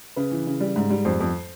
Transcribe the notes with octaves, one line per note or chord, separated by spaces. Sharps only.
C#3 B4
E3
C#3
G3
G#2
G3
F2 C5
F2